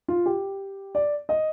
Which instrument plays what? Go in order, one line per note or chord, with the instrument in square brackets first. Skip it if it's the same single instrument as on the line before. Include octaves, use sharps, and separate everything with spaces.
[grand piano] F4
G4
D5
D#5